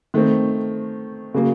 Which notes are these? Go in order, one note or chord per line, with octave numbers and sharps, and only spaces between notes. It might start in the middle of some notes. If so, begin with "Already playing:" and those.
D#3 A3 C4
C#3 F#3 A#3